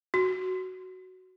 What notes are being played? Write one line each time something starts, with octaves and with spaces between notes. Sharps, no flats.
F#4